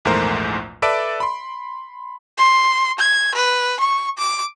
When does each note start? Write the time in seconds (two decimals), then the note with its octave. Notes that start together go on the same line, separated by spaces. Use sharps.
0.05 A#1 E2 G#2 A3 A#4 C5
0.82 A4 B4 D5 E5 A5 D7
1.20 B5 C6
2.37 C6
2.99 G#6
3.35 B4
3.80 C#6
4.18 D6